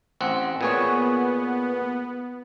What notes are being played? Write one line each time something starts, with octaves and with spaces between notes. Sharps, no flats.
A1 C4 F#5
A#2 B3 G#4 C#5